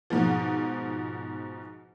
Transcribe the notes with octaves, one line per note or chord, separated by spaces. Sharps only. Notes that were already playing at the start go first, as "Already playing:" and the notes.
G#2 B2 F3